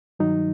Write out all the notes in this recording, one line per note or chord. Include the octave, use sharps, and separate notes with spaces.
G2 D#3 F#3 D#4